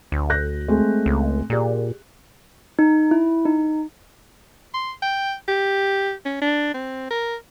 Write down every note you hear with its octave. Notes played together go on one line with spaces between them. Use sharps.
D2
F#6 G6 A#6
G#3 A3 C4
C#2
A#2 G4 G#4 D5
D#4
E4
D#4
C6
G5
G4
C#4
D4
C4
A#4